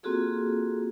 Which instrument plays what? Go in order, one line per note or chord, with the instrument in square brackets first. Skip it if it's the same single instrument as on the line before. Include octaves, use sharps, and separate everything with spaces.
[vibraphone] A#3 C4 F4 F#4 G#4 A4